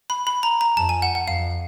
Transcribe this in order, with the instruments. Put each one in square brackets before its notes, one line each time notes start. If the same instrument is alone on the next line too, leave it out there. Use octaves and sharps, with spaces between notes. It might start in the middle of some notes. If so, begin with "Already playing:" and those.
[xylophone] B5
B5
A#5
A#5
[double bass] F2 [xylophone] A5
[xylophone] G#5
F#5
F#5
[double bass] F2 [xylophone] F5